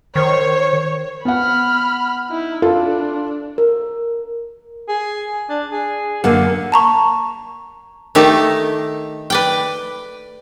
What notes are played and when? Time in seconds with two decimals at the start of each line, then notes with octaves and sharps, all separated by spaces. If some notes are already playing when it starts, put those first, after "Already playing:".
0.16 D#3 C5 C#5
1.25 B3 F#5 B5 F6
2.29 D#4 E4
2.62 D4 F4 A4
3.58 A#4
4.88 G#4
5.49 D4
5.72 G#4
6.24 F#2 D3 A#3 F#5
6.72 A5 A#5 C#6
8.15 D#3 A3 D#4 G4 A5
9.30 B4 D5 G5